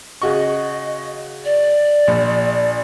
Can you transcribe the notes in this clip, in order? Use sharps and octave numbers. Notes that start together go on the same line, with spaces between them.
C#3 F#4 D#5 C#6
D5
A#1